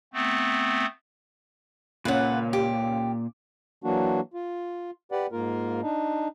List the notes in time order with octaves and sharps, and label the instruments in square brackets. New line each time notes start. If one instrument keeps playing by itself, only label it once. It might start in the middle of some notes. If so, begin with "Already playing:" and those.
[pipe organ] A3 B3 C4
[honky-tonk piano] C#2 C#4 [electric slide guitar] A#2 [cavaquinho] B4 F#5
[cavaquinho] G4
[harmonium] E3 F#3 A#3 D4 F#4
F4
G4 B4 D5 F#5
G#2 A#3 F4 A#4
D4 D#4